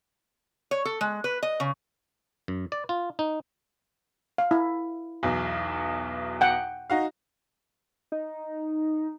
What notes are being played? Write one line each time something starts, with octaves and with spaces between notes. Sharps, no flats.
C#5
A4
G#3
B4
D#5
C#3
F#2
D5
F4
D#4
F5
E4
B1 E2 B2
F#5 G5
D#4 F#4 F5
D#4